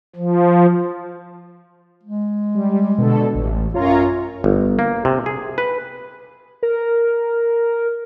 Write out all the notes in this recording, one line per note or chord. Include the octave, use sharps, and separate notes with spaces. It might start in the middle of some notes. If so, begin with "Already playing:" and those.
F3
G#3
G3
B2 D3 A4
A1
F#2 F4 C#5 A#5
G1
A#3
C3
G#4
B4
A#4